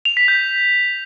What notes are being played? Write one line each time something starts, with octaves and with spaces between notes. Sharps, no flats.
F7
B6
G6